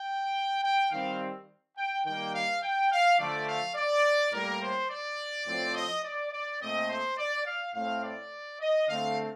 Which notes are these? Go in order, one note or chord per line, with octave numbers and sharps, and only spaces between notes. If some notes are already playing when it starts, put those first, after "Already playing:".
Already playing: G5
G5
D#3 G3 C4 F5
G5
D#3 G3 A#3 G5
F5
G5
F5
D3 F3 A3 D5
F5
D5
A2 G3 A#3 A#4
C5
D5
A2 F3 C4
D#5
D5
D5
A#2 A3 C4 D#5
C5
D5
F5
A2 A3 C4 F5
D5
D#5
D3 A3 C4 F5